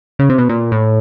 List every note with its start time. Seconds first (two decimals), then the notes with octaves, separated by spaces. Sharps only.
0.19 C#3
0.30 C3
0.38 B2
0.49 A#2
0.72 A2